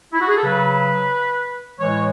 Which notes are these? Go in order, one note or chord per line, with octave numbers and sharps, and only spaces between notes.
E4
F#4
G#4
A4
C#3 F#3 B4
A2 E3 G#3 C#5